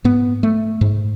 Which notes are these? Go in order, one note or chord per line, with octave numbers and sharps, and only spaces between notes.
G#2 B3
A3
G#2